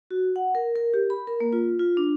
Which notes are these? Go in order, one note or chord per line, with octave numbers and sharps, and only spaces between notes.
F#4
F#5
A#4
A#4
G4
B5
A#4
A#3
F4
F4
D4